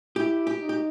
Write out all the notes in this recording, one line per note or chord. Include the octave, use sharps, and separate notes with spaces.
E4 G4
G4
D#4
G4